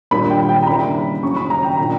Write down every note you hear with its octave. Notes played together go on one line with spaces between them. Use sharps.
A#2 G3 A#3 D4 B5
G5
G5
A#5
C#3 E3 G3 A#3 D4 B5
C#3 F#3 C#4 C#6
B5
A#5
G5
A#2 A#3 D4